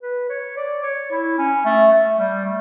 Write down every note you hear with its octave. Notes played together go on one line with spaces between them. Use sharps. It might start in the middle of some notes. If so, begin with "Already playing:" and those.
B4
C#5
D5
C#5
E4
C#4
A3
A3
G3
A3